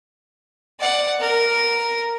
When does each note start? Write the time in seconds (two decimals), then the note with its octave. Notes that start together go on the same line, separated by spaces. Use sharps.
0.80 D5 F#5
1.20 A#4